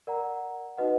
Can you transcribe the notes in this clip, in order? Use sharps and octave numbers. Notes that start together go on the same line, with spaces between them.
A#4 D5 F#5 A#5
D#4 F#4 B4 D#5 F#5